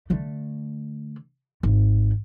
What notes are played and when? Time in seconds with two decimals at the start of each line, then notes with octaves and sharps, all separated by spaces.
0.10 D3 A3
1.63 G#1